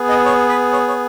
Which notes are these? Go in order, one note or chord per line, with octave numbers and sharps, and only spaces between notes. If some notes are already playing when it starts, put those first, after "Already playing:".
Already playing: B3 G#4
D#5
C#5
B4
C#5
C#5